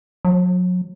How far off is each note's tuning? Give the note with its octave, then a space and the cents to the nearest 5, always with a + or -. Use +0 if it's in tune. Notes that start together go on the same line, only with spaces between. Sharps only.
F#3 -35